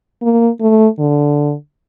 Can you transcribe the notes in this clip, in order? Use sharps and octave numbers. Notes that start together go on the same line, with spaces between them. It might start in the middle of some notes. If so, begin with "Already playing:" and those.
A#3
A3
D3